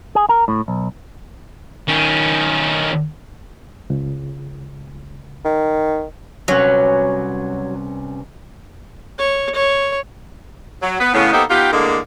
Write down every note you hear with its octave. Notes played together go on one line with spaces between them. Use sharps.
G#4
A#4
A2
B1
D#3 C#4
C#2
D#3
C2 F#3 C#4 B4
C#5
C#5
F#3
B3 B4
A2 C#3 B3
A#3 B3 D#4 G4 A4 C5
B3 D#4 F4 G4
A2 D3 G#3 A#3